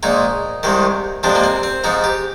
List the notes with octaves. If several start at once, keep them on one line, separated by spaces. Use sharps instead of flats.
A#1 A#2 G#3 D#4
C2 C3 D#3 G#3
F2 C3 F3 G#3 D4
A#3
C4
C4
G#2 F3 G#3 D#4
G4